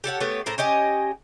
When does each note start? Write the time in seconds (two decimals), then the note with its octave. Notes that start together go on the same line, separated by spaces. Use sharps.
0.04 G4 A4 C#5 F#5
0.20 A3 B3 G4 C#5
0.46 A2 A#4 C5
0.58 C#4 G4 D#5 G#5